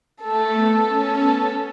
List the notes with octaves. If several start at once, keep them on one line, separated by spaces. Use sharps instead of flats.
A3 A4
B3
C#4
B3 A4